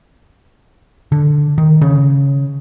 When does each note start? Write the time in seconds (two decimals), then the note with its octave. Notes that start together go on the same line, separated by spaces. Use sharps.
1.12 D3
1.58 D#3
1.81 C#3